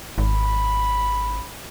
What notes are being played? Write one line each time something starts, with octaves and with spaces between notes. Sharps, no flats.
G#1 B5